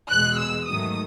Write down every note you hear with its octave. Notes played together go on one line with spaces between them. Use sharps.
E2 B2 G#3 F#6
E6
G#2 D#3 F#3 A3 D#6